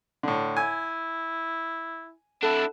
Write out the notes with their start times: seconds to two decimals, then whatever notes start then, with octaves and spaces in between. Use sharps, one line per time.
0.23 A2 D3
0.57 E4 G#5
2.43 D4 E4 A4 F#5